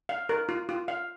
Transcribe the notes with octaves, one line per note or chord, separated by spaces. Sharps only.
F5
A#4
F4
F4
F5